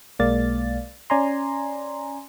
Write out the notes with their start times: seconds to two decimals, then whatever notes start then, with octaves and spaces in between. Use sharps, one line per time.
0.19 B1 G#3 A#3 D5 F5 A6
1.10 C#4 D5 G#5 A#5 C6